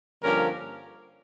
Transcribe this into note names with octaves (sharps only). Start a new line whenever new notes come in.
G2 D3 F3 A#3 C#4 A#4